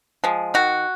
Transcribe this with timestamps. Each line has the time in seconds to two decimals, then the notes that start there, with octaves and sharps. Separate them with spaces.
0.24 F3 G#3
0.54 D#3 F#4